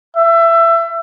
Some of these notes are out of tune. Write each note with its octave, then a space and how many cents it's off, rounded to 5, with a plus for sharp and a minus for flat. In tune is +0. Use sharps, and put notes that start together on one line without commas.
E5 +25